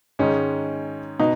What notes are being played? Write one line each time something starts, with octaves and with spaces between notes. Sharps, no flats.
G#2 D#3 G#3 C#4
B2 D#4